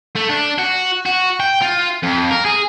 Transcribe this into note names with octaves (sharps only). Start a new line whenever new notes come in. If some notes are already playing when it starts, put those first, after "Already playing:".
A3
D4
F#4
F#4
G5
F4
F2
A#4
G#4